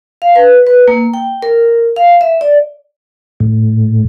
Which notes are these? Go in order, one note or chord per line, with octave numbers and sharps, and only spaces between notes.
F5
B4
B4
A#3
G5
A#4
F5
E5
D5
A2